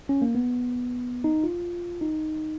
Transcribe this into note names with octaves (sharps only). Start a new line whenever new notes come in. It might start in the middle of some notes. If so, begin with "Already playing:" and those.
C#4
A#3
B3
D#4
F4
D#4